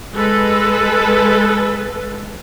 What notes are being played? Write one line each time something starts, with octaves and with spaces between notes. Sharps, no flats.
G#3 A4 B4